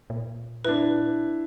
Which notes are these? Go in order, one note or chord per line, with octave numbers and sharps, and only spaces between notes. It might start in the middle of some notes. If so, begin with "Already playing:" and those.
A#2
D4 E4 B4